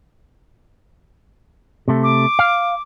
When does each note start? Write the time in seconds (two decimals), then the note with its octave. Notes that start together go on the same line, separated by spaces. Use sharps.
1.88 C3 A3
2.03 D6
2.39 F5